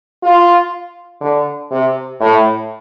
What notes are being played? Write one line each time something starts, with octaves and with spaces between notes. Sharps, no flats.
F4
D3
C3
A2